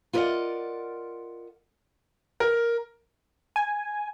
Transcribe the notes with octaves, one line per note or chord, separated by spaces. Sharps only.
F4 A#4 B4 D5 D#5 F#5
A#4
G#5